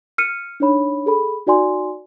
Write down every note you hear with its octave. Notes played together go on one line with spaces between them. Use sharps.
F6 C#7 D#7
D4 D#4 C#5 B5
G#4 A4 B5
D#4 F#4 D5 G#5 C6